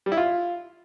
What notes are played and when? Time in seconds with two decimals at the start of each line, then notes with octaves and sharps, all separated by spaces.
0.06 G3
0.12 E4
0.17 F4